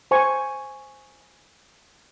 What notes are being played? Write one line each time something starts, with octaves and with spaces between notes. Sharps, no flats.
C5 G#5 C#6